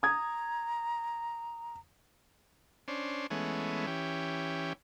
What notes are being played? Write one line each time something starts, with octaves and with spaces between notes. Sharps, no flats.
A#5 D#6 G#6
C#4 D4 C5
E3 G#3 A3 B3 C#4
E3 C#4 G4